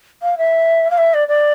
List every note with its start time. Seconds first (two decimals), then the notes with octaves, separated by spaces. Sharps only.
0.22 F5
0.37 E5
0.90 F5
0.97 E5
1.13 D5
1.28 D5